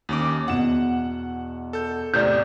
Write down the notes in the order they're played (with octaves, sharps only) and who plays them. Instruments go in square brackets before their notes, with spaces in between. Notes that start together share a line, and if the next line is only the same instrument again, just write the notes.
[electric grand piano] D#2 C#4 D6
[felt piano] E2 B2 [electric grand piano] F#5 E7
[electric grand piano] A4 G6
[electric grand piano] E2 A2 C3 [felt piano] D5 G6